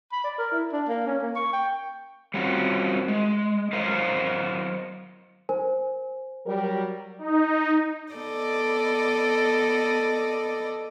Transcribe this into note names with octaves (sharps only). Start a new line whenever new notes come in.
B5
D5
A#4
E4
D4
A#3
C#4
A#3
C#6
G5
G3 C4 C#4 F4 F#4
G#3
F#3 A#4 C5 D#5 F5
A#4 C5 G#5
F#3 G3 A#4
D#4
B3 A4 D5 D#5